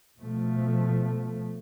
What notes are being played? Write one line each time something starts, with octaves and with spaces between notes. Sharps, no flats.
B2 F3 A3